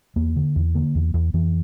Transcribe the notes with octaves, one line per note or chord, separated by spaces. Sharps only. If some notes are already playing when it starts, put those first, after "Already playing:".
E2 A#3
D3
E2
D3 A#3
E2
E2
F2 E3